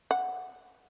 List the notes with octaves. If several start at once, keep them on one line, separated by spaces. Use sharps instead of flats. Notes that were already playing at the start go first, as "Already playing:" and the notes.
F#5